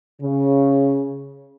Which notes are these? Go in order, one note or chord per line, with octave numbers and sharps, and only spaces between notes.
C#3